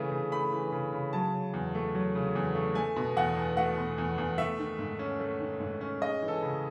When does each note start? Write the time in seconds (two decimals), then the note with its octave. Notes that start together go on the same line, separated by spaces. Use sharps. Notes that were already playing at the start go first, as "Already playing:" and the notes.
Already playing: C#3 E3 A3
0.12 C#3
0.32 A3 B5
0.53 E3
0.72 C#3
0.92 C#3
1.13 F#3 A5
1.34 C#3
1.53 E2
1.75 A3
1.94 F#3
2.15 C#3
2.35 E2
2.55 A3
2.75 A3 G#5
2.96 B2
3.17 E2 F#5
3.37 E2
3.57 A3 F#5
3.78 B2
3.98 E2
4.18 E2
4.38 A3 E5
4.59 D#3
4.79 G#2
4.99 C#4
5.20 A3
5.40 D#3
5.60 G#2
5.81 C#4
6.01 G#3 D#5
6.22 E3
6.28 A4
6.42 C#3